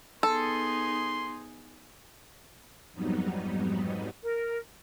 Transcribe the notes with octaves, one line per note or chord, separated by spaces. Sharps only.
B3 D#4 G#4 A4 C6
F2 G#2 F#3 G3 B3 D#4
A#4